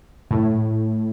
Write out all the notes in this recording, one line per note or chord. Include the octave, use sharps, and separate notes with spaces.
A2